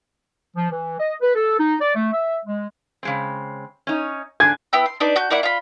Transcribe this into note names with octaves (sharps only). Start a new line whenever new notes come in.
F3
E3
D#5
B4
A4
D#4
D5
A3
E5
G#3
C#3 G#3 C4
C#4 D#4
D3 D4 G#5 G#6
B3 E4 G5 E6
C6
D4 D#4 B4 D5
F#4 G6
A#3 E4 D5 F#5
F4 B5